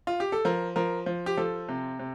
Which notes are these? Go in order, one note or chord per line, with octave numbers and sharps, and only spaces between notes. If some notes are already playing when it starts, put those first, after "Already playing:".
F4
G4
A4
F3 A#4
F3 A#4
F3
G4
F3 A4
C3
C3